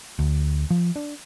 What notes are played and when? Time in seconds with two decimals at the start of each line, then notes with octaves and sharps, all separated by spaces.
0.19 D2
0.70 F3
0.96 D4